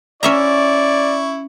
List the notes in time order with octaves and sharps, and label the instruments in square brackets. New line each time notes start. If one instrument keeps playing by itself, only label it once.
[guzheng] C#4 E5 A#5 [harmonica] E4 C#6 [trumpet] D5